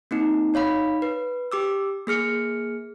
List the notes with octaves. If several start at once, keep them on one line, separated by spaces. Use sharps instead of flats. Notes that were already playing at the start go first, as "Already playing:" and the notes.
A#3 C4 D#4
D#4 C#5 F5 B5
B4
G4 D6 E6
A#3 G#4 F6 C#7